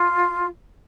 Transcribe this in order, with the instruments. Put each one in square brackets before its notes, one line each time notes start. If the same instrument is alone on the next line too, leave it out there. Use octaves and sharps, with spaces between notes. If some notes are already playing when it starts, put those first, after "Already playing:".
Already playing: [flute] F4